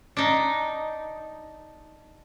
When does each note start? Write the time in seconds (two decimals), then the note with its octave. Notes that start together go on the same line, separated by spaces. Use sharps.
0.17 D4 D#4